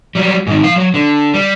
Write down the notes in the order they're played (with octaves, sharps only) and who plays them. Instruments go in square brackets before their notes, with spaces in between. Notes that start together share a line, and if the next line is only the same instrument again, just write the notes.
[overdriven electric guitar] F#3 G3
G#2 D#3
F3 F5
F#3
D3
G3